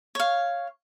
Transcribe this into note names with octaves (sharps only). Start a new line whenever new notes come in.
C#5 F5